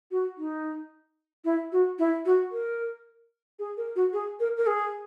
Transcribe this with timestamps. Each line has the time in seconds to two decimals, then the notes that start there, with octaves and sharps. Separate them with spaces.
0.11 F#4
0.38 D#4
1.45 E4
1.72 F#4
1.99 E4
2.25 F#4
2.52 A#4
3.59 G#4
3.77 A#4
3.96 F#4
4.13 G#4
4.40 A#4
4.57 A#4
4.67 G#4